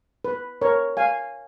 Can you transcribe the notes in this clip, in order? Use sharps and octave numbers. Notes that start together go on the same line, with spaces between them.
B4
A#4 C#5
F5 G#5